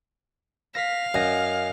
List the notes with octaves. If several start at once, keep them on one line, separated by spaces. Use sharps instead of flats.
F5 A#6 B6
F#2 D#5 G#5 A#6